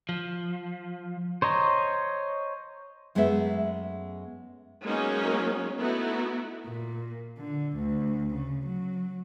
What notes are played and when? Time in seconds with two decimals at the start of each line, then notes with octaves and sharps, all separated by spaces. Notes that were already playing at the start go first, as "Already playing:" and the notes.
0.09 F3
1.42 C5 C#5 D#5 A#5
3.15 F#2 G#3 A3 B3 E4 E5
4.84 F#3 G#3 A#3 B3 C#4 D#4
5.79 A3 B3 D#4 E4 F#4
6.66 A#2
7.38 D3
7.77 D2
8.34 C#3
8.66 F#3